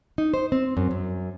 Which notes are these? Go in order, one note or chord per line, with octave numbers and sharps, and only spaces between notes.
D#4
C5
C4
F#2
F#2